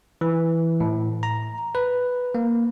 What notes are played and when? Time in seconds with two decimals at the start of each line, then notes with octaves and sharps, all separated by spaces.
0.21 E3
0.80 A2
1.23 A#5
1.75 B4
2.35 A#3